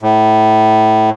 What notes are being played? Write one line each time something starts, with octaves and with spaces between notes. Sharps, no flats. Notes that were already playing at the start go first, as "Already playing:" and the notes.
A2